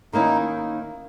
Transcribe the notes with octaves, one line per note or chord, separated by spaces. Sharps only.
D#3 A#3 C#4 D#4 E4